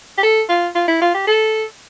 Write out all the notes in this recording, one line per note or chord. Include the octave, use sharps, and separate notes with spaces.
G4
A4
F4
F4
E4
F4
G4
A4